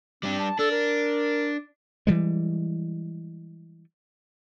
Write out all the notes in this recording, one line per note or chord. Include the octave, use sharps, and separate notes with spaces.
G3 C4 D4
A5
D4 A4
A#4
E3 G3 G#3